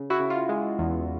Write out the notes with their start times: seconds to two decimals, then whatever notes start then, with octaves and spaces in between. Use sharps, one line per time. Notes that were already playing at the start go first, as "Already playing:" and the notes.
Already playing: C#3
0.10 E4 F#4
0.20 C#3
0.30 F4
0.49 G#3
0.79 E2